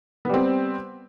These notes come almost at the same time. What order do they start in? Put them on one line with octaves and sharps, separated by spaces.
B3 G3 C4